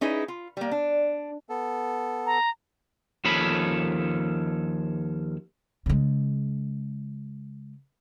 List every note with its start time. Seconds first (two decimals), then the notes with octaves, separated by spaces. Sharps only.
0.01 C#4 D#4 E4 G#4 B4
0.28 F4
0.57 G3 A#3
0.71 D4
1.49 B3 A4
2.26 A#5
3.25 D#2 F3 C#4 A4 B5
5.86 C#3 G#3